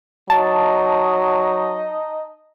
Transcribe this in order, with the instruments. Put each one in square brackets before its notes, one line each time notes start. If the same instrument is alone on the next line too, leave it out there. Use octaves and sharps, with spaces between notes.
[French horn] F#3 [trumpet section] D#4 D#5 [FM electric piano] A5